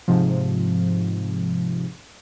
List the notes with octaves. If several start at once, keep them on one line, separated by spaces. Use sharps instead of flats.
G#2 C3 F3